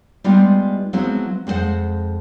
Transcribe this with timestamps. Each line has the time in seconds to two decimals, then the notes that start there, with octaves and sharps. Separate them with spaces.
0.24 G3 G#3 B3 D#4 F4 G4
0.93 F3 F#3 G#3 B3 C4 E4
1.47 F2 G#3 C4 C5 F#5